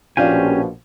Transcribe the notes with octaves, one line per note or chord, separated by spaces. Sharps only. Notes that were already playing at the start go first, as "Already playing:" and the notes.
A#1 B2 F3 C#4 D4 F4 G4 G#5